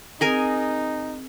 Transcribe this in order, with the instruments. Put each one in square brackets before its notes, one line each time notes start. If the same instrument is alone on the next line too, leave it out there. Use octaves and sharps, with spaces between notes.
[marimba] C4 [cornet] D#4 [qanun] G#4 A#4 G#5